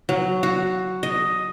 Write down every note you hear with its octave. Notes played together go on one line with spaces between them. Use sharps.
F#3
F#4
D#5